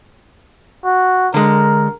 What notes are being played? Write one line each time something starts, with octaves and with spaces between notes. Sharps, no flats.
F#4
D3 G#3 A#4